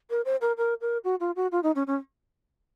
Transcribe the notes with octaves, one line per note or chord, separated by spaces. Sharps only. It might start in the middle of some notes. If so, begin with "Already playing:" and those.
A#4
C5
A#4
A#4
A#4
F#4
F4
F#4
F4
D#4
C#4
C#4